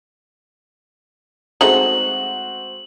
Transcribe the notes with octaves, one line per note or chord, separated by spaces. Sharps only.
G#3 A3 C4 D#4 F#4 F#7